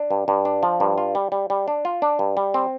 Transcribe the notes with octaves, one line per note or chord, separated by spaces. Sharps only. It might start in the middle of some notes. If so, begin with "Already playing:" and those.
Already playing: D4
G2
G2
D4
F3
G2
F4
G3
G3
G3
D4
F4
D4
G2
G3
C4